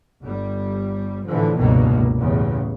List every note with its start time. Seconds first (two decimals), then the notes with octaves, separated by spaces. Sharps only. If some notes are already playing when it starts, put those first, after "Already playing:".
0.23 G1 G3
1.27 A2 D3 E3 F3
1.58 F1 C#2 G2 B2 D#3 A#3
2.18 A1 E2 C#3